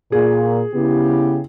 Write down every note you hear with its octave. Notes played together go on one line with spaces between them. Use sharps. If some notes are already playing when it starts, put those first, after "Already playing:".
A#2 G#4
C#3 B3 E4 G4